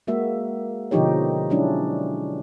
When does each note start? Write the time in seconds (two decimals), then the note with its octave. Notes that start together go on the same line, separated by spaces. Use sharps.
0.07 G#3 A#3 F#4 E5
0.91 B2 D3 F3 D#4 G4 C#5
1.50 F#3 G#3 C#4 D4 E4